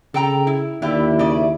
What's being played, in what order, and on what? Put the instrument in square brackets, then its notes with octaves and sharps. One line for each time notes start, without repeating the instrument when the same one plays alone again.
[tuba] C#3 [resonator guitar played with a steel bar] A4 G5 A#5
[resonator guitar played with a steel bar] E4
[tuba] D#2 [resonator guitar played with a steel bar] D3 G4 [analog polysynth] E4
[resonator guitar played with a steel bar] C#3 D5